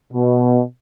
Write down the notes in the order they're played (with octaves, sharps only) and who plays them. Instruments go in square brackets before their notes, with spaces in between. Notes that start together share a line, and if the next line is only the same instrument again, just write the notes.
[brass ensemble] B2